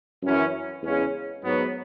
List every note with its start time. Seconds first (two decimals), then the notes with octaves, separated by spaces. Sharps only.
0.23 F#2 E3 C#4
0.83 E2 C#3 G#3 C#4
1.44 G#2 F#3 B3